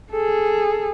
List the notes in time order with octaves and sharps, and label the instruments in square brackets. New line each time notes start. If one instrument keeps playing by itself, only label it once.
[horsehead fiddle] G#4 A4